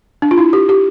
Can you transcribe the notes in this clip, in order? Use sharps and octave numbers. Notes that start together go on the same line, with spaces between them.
D4
F4
E4
G4
G4